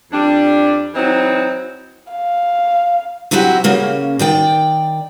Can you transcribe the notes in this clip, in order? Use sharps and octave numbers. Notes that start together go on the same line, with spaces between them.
F2 G3 D4
E3 F#3 C4 D#4
F5
C3 F#3 E4 F#4 G4
C#3 A#3 C#4
D#3 D5 G5